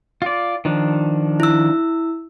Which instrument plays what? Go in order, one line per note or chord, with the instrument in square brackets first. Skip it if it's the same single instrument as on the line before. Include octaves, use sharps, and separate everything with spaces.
[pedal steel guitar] F4 D5
D#3 F3 D4
[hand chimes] E4 E6